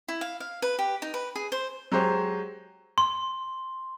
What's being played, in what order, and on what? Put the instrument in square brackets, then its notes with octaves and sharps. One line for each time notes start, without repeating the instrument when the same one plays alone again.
[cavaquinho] E4
F5
F5
B4
G4
D#4
B4
G#4
C5
[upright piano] F#3 G#3 G4 C5 C#5
[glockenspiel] C6